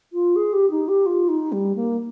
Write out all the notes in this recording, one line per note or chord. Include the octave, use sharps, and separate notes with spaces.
F4
G#4
G4
D#4
G4
F4
D#4
G3
A#3